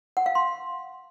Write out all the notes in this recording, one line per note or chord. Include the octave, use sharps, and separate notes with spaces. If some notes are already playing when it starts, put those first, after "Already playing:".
F#5
F5
C6